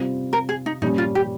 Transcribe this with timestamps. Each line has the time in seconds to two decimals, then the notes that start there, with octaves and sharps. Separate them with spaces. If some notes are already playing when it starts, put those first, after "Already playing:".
Already playing: C3 G3 C4 F4
0.33 A#4
0.49 G#4
0.66 D#4
0.82 A#2 G3 C#4 D#4
0.98 F4
1.15 G4